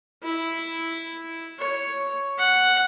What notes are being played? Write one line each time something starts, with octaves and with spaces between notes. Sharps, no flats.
E4
C#5
F#5